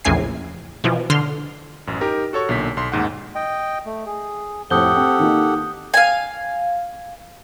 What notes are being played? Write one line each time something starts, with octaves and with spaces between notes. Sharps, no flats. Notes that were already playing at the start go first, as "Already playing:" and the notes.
A#1 E2 A2 C#3 G#5 C7
B2 E3 F3
D3 C6 F6
A1 F#2
D#4 G4 A#4
F#4 A4 C#5 C#6
B1 A#2 D3 B6
B1 C6
A1 D#2 G#2 F#5
D#5 G5
A3
G#4
F2 A2 G4 A4 F#5 D#6 G6 G7
C4
D#3 A#3 D#4
F5 G#5